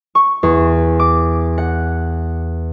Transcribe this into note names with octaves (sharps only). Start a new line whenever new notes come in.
C#6
E2
D6
F#5